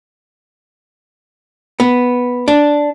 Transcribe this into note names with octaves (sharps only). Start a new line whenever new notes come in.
B3
D4